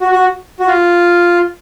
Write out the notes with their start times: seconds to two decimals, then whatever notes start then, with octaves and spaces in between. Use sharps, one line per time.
0.01 F#4
0.12 F#4
0.60 F#4
0.68 F4